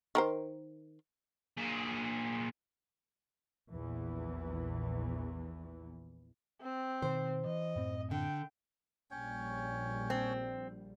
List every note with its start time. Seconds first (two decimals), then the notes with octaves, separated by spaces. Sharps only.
0.15 D#3 A#4 C5
1.57 A#2 G#4
3.70 A#1 E2 E3
6.61 C4
7.02 B2 D#3 C5
7.46 E3 D#5
7.76 F#2 A2 C4
8.11 D3 G5
9.11 A#1 G3 C#4 C#5 G5
10.10 C4